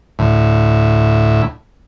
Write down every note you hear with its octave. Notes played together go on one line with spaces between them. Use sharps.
D2 A2